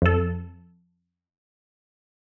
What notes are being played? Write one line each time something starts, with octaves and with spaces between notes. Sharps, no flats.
F2 A4